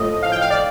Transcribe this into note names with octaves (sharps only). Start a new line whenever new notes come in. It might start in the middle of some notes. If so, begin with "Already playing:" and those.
Already playing: A2 F3 A3 D#5
F5
G5
F5
D5